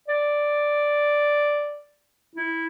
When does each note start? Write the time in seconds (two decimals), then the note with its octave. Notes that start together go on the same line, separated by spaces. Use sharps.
0.08 D5
2.35 E4